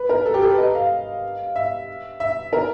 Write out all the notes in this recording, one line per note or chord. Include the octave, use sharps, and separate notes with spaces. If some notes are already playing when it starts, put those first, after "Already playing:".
Already playing: B4
A#4
A4
G4
A4
B4
D#5
F5
E5
E5
A#4